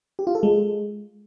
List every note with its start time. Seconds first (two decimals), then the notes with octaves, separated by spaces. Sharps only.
0.19 G4
0.27 F4
0.35 A4
0.43 G#3